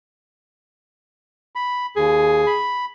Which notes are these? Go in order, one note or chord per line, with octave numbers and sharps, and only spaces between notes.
B5
D#2 G#4
B5